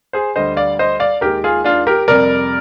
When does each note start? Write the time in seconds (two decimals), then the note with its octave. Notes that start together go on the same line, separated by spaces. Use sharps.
0.13 G#4 C5
0.36 D2 D3 G3 C5 D#5
0.57 D5 F5
0.79 C5 D#5
1.00 D5 F5
1.21 D#2 D#3 G#3 G4 A#4
1.44 F4 G#4
1.64 D4 F4
1.87 G4 A#4
2.08 F2 C3 G3 A#4 D5